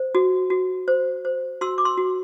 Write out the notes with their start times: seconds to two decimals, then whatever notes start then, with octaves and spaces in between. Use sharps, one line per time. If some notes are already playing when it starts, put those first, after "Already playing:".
Already playing: C5
0.15 F#4
0.50 F#4
0.88 C5
1.25 C5
1.61 F#4 C6 E6
1.78 D6
1.85 C6 E6
1.98 F#4